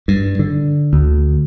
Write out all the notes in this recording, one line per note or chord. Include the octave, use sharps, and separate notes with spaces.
G2
D3
D2